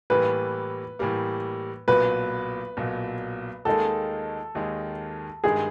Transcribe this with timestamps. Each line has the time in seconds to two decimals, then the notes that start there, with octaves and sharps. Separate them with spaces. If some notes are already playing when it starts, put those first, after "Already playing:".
0.10 A2 E3 G3 A#3 B4
0.99 A2 E3 G3 A#3
1.88 B1 A#2 F#3 B4
2.77 B1 A#2 F#3
3.65 D#2 D#3 G#3 A4
4.55 D#2 D#3 G#3
5.44 G2 D#3 G#3 G#4